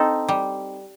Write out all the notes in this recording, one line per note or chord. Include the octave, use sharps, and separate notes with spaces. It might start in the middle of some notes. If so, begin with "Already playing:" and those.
Already playing: C4 D#4 A4
G3